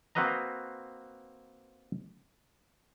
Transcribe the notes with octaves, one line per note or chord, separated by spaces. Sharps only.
A#3 C4 F#4 B4 D#5 A#5